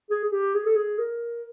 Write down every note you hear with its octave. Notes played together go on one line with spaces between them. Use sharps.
G#4
G#4
G4
G#4
A4
G#4
A#4